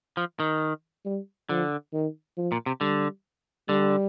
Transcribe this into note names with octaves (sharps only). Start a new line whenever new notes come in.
F3
D#3
G3
D3 F3
D#3
F3
A#2
C3
D3 G3
D3 G3